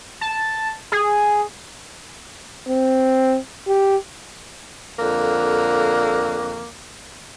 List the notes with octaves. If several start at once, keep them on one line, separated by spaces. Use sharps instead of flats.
A5
G#4
C4
G4
F2 D3 A#3